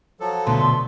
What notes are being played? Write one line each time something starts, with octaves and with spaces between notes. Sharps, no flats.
F3 F#3 A4
D2 B2 B4 C6